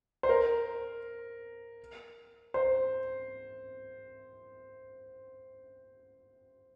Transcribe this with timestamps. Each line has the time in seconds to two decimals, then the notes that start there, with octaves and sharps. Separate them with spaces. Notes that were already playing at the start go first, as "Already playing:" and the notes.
0.23 C5
0.29 A#4
2.54 C5